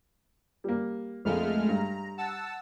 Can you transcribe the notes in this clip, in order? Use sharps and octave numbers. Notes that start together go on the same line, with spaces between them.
G3 A#3
A#1 F2 G#3 A3 F6
G2 A#5
F#5 A5 E6